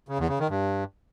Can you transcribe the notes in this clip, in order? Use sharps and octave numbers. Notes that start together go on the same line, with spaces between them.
C#3
E2
C#3
D#3
G2